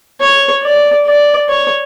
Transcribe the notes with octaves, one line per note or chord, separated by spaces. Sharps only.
C#5
D5
D5
C#5